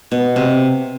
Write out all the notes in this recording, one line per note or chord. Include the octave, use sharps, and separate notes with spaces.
B2
C3